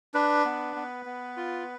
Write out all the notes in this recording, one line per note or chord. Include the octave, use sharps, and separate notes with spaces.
D4 B4
B3
B3
B3
F4